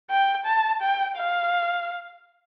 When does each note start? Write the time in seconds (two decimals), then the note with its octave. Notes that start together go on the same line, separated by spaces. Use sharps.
0.10 G5
0.46 A5
0.82 G5
1.17 F5